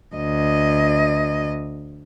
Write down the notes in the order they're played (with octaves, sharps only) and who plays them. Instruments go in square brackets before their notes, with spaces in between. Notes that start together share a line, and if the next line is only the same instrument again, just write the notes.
[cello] D2 D#5